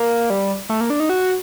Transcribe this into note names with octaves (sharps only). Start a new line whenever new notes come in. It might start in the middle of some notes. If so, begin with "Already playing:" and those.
Already playing: A#3
G3
A3
A#3
D4
D#4
F#4